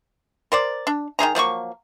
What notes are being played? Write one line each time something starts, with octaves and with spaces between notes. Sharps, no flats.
A#4 C5 D5
D4
D#3 D#4 G#4 A#5
F3 F#3 A#3 C#6